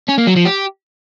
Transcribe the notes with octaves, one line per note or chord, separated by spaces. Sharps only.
C#4
A#3
F#3
F3
G4